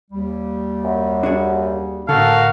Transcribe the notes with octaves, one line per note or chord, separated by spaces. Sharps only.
D#2 G3
F#2
D4 F#4 G#4
A2 D3 F#4 A4 A#4 F5